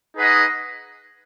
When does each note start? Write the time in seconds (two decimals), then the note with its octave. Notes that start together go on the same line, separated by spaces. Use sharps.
0.16 D#4 G#4 B4 D#5 F#5